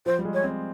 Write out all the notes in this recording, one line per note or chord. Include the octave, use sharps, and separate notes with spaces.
F3 C5
G3
G#3
C#5
C4